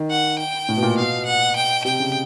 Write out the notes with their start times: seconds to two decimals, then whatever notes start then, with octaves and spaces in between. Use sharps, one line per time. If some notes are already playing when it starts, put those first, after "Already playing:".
Already playing: D#3
0.11 F#5
0.39 G5
0.69 A2
0.76 B2
0.83 A#2
0.97 B2 F5
1.26 F#5
1.56 G5
1.85 C3 G5
2.00 C#3